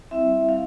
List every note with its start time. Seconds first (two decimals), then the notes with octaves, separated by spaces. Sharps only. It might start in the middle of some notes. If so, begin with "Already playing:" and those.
0.11 G3 C4 E4 E5
0.49 F5